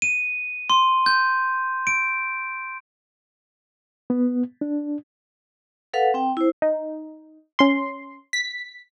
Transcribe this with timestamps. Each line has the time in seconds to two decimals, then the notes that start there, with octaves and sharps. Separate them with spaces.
0.02 D#7
0.70 C6
1.06 G6
1.87 D7
4.10 B3
4.61 D4
5.94 A4 B4 F5 F#5
6.14 C4 G5
6.37 E4 C5
6.62 D#4
7.59 C#4 C6
8.33 B6